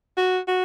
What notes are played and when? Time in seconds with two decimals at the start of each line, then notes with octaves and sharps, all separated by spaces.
0.17 F#4
0.48 F#4